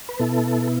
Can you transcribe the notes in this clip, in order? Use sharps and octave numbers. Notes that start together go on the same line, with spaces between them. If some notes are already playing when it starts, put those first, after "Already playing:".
B4
B2 B3 E4 A4